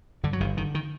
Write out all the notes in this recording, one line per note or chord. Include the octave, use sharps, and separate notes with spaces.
G2 D3
F#3
G1 D#3
D3 D#3
D#3